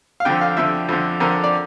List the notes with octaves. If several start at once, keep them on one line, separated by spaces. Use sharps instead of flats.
F5
F2 D3 G5
F5
F2 D3 E5
F2 D3
F2 D3 A#4
D5